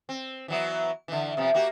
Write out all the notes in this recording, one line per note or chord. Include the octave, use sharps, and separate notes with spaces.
C4
E3 F#3 B3
D3 E3
C3 F3 B3
A#3 F#4 G4